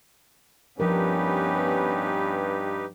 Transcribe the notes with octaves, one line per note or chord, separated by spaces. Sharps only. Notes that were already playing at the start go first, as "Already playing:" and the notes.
G2 F3 B3 C#4 D#4 G4 A#4 B4